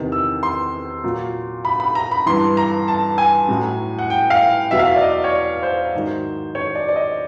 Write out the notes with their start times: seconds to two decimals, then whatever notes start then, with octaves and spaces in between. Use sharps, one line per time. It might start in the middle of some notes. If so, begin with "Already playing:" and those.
Already playing: E2 C3 D#3
0.12 E6
0.43 C6
1.04 A#2 F#3
1.65 B5
1.80 B5
1.95 A#5
2.11 B5
2.26 G2 E3 C6
2.57 A#5
2.88 A5
3.18 G#5
3.48 A2 F#3
3.99 F#5
4.10 G5
4.30 F5
4.71 E2 B2 F#3 E5
4.79 F5
4.87 E5
4.96 D5
5.02 D#5
5.24 C#5
5.33 D5
5.63 C5
5.94 G#2 D#3 F#3
6.55 C#5
6.75 D5
6.88 D5
6.96 D#5